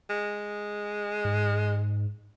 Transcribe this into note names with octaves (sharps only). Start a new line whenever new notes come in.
G#3
G#2